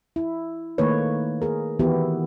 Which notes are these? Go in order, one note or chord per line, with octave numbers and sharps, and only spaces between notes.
E4
D#3 A3 A#3 D#4 B4 C#5
G#4 A#4
D#3 E3 B3 E4 F#4 G4